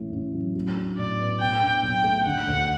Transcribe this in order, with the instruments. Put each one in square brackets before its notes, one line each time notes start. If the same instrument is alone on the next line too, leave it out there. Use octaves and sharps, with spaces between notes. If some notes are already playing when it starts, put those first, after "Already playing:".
Already playing: [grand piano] A1 A2
A1
F#3
F#3
D4
[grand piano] A2 [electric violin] D5
[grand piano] B3
[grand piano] B2 [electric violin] G5
[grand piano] D4
[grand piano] B1 [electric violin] G5
[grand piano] A3
[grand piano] D3 [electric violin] F#5
[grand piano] D2